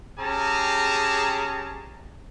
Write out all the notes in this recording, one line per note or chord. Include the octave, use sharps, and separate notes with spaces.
C#4 G4 G#4 A5 A#5